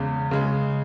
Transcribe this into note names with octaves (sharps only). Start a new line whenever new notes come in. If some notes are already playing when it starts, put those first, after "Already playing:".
Already playing: E2 C#3 G#3
C#3 G#3